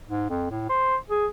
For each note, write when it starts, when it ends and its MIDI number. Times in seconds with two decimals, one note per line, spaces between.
0.09 0.27 44
0.30 0.46 41
0.50 0.68 45
0.69 0.96 72
1.10 1.26 68